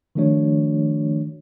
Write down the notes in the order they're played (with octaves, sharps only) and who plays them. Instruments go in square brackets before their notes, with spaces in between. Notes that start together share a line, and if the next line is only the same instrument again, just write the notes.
[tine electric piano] D#3 F3 A3 D4 F#4 C#5